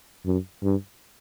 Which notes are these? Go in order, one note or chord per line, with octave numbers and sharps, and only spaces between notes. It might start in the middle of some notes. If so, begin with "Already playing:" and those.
F#2
G2